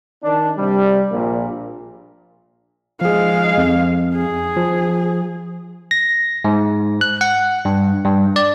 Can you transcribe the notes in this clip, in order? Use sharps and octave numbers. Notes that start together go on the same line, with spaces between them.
D#3 D4
C3 G3
A#1 A#2
F3 G#3 G#4 F5
F2
G#4
F3
A#6
G#2
F#6
F#5
G2
G2
D5